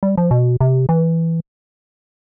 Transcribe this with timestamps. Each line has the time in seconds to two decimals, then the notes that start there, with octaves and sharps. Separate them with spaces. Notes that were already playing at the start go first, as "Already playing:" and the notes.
0.03 G3
0.18 F3
0.31 B2
0.61 C3
0.89 E3